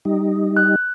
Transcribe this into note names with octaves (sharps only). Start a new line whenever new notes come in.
G3 D#4
F#6